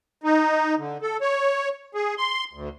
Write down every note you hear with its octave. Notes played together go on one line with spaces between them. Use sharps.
D#4
D3
A4
C#5
G#4
C6
D2